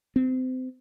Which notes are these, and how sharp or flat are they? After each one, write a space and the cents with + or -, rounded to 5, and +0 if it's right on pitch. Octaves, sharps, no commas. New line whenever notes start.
C4 -30